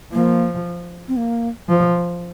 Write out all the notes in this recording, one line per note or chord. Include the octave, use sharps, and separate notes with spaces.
F3 A#3
C4
A#3
F3